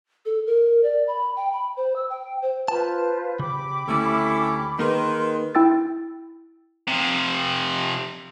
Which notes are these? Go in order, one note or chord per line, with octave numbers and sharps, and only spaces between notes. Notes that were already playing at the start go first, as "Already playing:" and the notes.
A4
A#4
D5
B5
G5
B5
C5
E6
G5
C5
F4 B4 C5 A5
C#3 G4 B5 D6
D2 A3 C#4 E4 A4
D#3 A#3 D#4 G#4 B4 C6
E4 G5 E6 A6
C3 F3